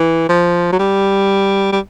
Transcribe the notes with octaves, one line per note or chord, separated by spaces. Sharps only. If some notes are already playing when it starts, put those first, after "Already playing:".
Already playing: E3
F3
F#3
G3
G3